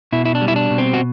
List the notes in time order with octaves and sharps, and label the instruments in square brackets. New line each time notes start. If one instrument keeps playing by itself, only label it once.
[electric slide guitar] B2 E4
E4
D4
G3
E4
D4
B2
C4
F#4